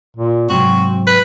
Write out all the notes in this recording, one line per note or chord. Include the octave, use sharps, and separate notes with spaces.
A#2
G#2 C3 F#3 C4 F#4
B4